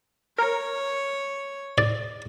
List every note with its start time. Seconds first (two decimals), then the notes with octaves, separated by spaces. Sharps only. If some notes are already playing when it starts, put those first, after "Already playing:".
0.38 A#4 C#5
1.78 D5